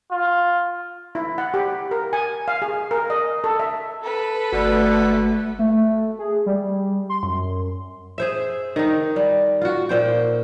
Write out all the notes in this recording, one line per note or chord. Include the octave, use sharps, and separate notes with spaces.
F4
E4
F#5
G4
A#4
G#5
F5
G#4
A#4
D#5
A4
E5
A4 B4
G1 B2 D3 A3 B3 F#4
A3
G#4
G3
C6
F#2
G#4 C5 E5
D#3 D#4
G3
F4 F#4
A#2 C5 G5